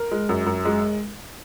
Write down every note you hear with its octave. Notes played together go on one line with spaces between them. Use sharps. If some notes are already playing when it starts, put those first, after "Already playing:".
Already playing: A#4
G#3
F#2
F#2
G#3